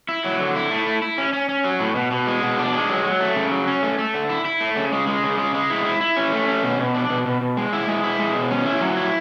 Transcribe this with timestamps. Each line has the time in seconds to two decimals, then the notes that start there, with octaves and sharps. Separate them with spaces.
0.09 E4
0.24 F#3
0.40 D3
0.55 E4
0.71 A3
0.86 E4
1.02 E4
1.18 C#4
1.33 C#4
1.49 C#4
1.64 F#3
1.80 A2
1.96 B2
2.11 B2
2.27 G#3
2.42 B2
2.58 D4
2.73 G#3
2.89 F#3
3.05 F#3
3.21 A3
3.36 C#3
3.51 F#3
3.67 C#4
3.83 A3
3.99 A3
4.14 D3
4.30 E4
4.45 E4
4.60 A3
4.76 C#3
4.92 G#3
5.07 G#3
5.23 C#3
5.39 G#3
5.54 G#3
5.70 E4
5.85 E4
6.01 E4
6.17 C#4
6.32 A3
6.48 C#4
6.63 B2
6.79 B2
6.94 D4
7.10 B2
7.26 B2
7.41 B2
7.57 G#3
7.73 E4
7.88 G#3
8.04 E4
8.20 G#3
8.35 B2
8.51 C#4
8.66 E4
8.81 F#3
8.97 E4